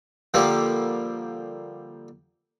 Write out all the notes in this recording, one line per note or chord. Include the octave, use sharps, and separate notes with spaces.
D3 F3 G3 A#3